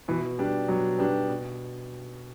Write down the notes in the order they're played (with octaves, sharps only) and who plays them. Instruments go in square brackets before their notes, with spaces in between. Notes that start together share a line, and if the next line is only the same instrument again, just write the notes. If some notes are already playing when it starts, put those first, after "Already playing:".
[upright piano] B2 [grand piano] E3
[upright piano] G3 B3 D4 G4
[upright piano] B2 [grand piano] F#3
[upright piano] G3 B3 D4 G4
B2